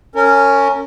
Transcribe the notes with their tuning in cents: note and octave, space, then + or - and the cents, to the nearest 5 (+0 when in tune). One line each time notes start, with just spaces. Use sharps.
C#4 +0 A#4 -30